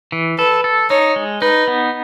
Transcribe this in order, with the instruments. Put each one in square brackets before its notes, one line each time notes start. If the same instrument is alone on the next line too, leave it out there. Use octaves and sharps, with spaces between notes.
[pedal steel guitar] E3
[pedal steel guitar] A4 [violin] B4
[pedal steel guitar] A4
[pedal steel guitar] D#4 [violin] C#5
[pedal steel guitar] G#3
[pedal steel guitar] D#4 [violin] B4
[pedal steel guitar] B3